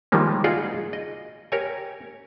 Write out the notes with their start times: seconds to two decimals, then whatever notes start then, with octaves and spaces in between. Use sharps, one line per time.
0.12 D#3 F3 G3 G#3 A#3
0.44 D#4 F4 F#4 G#4 D5 D#5
0.93 D#5
1.52 G4 A#4 C#5 G#5